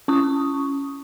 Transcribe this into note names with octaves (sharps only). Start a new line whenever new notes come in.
C#4 C#6 D#6